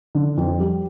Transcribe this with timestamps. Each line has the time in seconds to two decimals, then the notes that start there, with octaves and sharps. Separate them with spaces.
0.15 D3
0.37 F2
0.60 G3